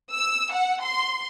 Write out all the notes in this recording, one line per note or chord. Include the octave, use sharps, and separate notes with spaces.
E6
F#5
C6